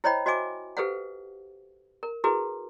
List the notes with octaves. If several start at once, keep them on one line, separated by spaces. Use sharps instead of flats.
E4 C5 C#5 D#5 G5 B5
F#4 C5 D#5 E5 G#5 D6
G4 A4 B4 C5 F5 F#5
A#4
E4 F#4 G#4 A#4 B4